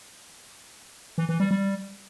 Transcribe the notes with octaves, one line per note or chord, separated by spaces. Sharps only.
E3
E3
G3
G3